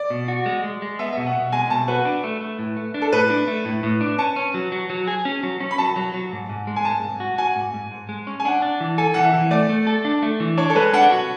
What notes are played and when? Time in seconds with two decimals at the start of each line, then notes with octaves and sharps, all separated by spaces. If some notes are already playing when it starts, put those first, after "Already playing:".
Already playing: D5
0.10 B2
0.28 F#4
0.46 G#3
0.64 G#3
0.82 G#3
0.99 B3 E5
1.13 B2 E5
1.26 F#5
1.35 B2
1.52 G#3 G#5
1.70 B2 A5
1.88 F#4 B4
2.05 D4
2.24 A3
2.41 A3
2.59 A2
2.77 A3
2.94 D4
3.02 A4
3.12 A2 B4
3.30 D4
3.48 A3
3.65 A2
3.83 A2
4.01 D4
4.18 C#4 A5
4.36 C#4
4.54 F#3
4.72 F#3
4.90 F#3
5.07 G#4
5.25 C#4
5.43 F#3
5.60 C#4
5.71 B5
5.78 F#3 A5
5.96 F#3
6.14 F#3
6.32 G#2
6.49 G#2
6.67 G#3
6.76 G#5
6.85 G#2 A5
7.02 G#2
7.20 F#4
7.38 F#4 G#5
7.56 G#2
7.74 G#2
7.91 G#2
8.09 G#3
8.27 C#4
8.40 G#5
8.45 D4 F#5
8.62 D4
8.80 E3
8.98 A4 G#5
9.14 E3 F#5
9.24 E5
9.34 E3
9.51 A3 D5
9.69 A3
9.87 A4
10.05 D4
10.23 A3
10.40 E3
10.58 D4 C#5
10.70 A4
10.76 G#3 B4
10.93 D4 F#5
11.11 F#4